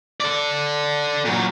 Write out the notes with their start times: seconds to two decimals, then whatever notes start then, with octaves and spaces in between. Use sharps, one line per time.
0.20 A4 D5
1.25 A#2 F#3